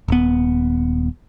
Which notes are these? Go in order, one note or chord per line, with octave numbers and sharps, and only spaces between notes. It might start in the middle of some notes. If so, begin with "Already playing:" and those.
D#1 B3